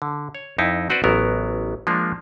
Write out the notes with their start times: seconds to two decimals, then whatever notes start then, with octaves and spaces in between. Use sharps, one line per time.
0.02 D3
0.35 C#5
0.58 F2 D#4 E4
0.90 C4 F#4 B4 C5 D5
1.04 A1 F#3 B3 A#4
1.87 F3 G#3 A#3 D4